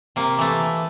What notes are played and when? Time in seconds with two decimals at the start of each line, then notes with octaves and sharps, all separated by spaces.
0.16 C3 A#3
0.38 E3 A3